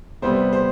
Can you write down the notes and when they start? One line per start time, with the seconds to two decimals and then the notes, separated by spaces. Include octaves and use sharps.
0.22 C3 G3 B3 C5
0.53 C5